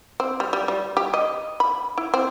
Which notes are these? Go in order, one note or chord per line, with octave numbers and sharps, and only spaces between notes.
C4
G3
G3
G3
G4
D#5
B5
E4
C4